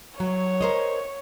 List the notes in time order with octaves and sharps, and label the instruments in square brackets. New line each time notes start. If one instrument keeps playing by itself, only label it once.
[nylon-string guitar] F#3 [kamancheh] C#5
[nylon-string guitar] A#4 C5 D#5